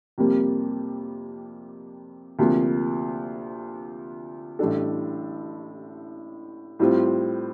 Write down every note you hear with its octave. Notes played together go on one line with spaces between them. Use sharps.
F2 C3 G3 A#3
D2 C3 F3 A#3
A1 A2 G3 D4 A4
A2 G3 C4 F4